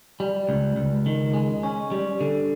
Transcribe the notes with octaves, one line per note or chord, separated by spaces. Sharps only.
G3
C#2
C#2
D#3
G#3
C#4
G3
D3